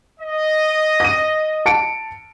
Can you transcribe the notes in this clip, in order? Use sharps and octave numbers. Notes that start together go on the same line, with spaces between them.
D#5
A#6 D#7
A5 C#7 D7